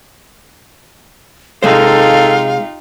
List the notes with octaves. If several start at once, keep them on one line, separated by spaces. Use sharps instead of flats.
C3 G#3 D#4 F4 G4 A4 C5 F5